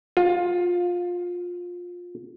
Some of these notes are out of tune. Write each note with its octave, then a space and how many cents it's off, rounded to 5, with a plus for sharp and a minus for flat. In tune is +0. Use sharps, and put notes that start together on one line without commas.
F4 +20